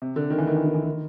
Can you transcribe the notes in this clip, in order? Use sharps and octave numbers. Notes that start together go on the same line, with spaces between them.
C3
D3
D#3
E3
D#3
E3
D#3
E3
D#3